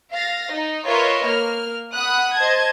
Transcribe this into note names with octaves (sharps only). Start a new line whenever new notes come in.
F5 A6 A#6
D#4
F4 A#4 B4 C#5 D#5 E5
A#3 F6
F#5 B5 D#6 F#6
C5 D#5 A5 G#6